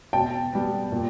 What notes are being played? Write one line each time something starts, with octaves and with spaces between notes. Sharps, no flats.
B2 G5 A5
G3 B3
A#2